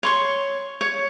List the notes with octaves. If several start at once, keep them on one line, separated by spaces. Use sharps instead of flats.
C#5 C6 C#6
C#5